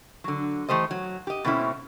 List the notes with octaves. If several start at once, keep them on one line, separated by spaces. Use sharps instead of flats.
D3 F#3
E3 A3 G4 C5 D#5
F#3
G4 D#5
B2 A3 C4 C#4 D#4 E4